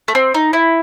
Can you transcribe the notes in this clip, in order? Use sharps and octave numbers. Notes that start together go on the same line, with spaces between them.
A3
C4
D#4
E4